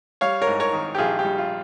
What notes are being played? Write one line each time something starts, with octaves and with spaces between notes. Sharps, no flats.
G3 C#5 F5
A#4 C#5
G#2
A#4 C#5
D#3
G4
A#1 F4 G#4
G4
G3
F4